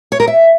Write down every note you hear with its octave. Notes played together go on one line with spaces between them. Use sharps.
C#5
A#4
E5